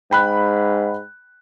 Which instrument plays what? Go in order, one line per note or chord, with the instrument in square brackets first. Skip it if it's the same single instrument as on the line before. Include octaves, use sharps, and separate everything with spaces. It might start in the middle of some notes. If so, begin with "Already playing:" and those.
[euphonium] G#2 [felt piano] G5 B5 F#6